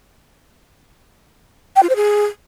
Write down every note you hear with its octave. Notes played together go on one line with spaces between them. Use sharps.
G5
F4
C5
G#4